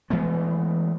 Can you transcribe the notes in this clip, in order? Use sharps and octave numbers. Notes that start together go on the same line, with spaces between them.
E3 G#3 A3 B3